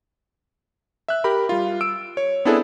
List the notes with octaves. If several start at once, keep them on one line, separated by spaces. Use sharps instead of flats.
E5 F#6
G4 A#4 B5
G3 F4
E6 D7
C#5
B3 C4 D4 E4 G#4 A4